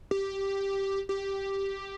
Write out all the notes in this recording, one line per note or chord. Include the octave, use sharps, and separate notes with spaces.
G4
G4